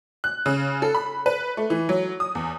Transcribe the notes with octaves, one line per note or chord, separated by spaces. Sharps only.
F#6
C#3
A4
B5
B4
A3
E3
F#3
D#6
E2